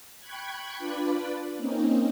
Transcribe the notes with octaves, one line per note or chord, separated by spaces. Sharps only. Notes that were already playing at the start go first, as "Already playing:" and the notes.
G5 B5 C#6 F#6 G#6
D4 F4 B4 D5 B5
A#3 C4 C#4 D#4